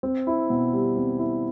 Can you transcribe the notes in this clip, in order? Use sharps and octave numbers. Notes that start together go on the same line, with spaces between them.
C4
E4
B2
G3
C4
E4